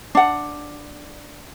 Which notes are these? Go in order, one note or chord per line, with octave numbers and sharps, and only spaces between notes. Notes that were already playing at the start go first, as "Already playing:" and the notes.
D4 F#5